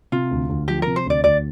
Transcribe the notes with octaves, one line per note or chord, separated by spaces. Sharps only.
C3 F4
D2
D2
F3 G4
C3 A#4
C5
D2 D5
D2 D5